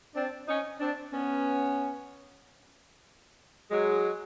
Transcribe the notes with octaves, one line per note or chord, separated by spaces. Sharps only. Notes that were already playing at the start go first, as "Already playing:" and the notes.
C4 D4
C#4 D#4
C4 D4
B3 C#4
F#3 G#3